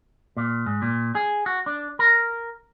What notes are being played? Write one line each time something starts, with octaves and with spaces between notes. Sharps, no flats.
A#2
G#2
A#2
G#4
F#4
D4
A#4